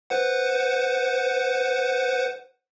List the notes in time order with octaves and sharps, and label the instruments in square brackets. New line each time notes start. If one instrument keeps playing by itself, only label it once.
[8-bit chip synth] B4 C5 F#5